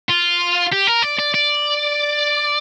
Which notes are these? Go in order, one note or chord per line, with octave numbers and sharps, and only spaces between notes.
F4
G4
A#4
D5
D5
D5